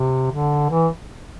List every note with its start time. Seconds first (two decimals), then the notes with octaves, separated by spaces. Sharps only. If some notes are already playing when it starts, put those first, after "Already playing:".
Already playing: C3
0.31 D3
0.70 E3